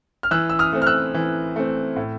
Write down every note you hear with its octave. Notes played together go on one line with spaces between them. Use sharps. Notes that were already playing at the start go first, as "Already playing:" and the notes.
F6
E3 E6 F#6
E6
D#6 F6
A3 C4
F6
E6 F#6
E3
A3 C4
A2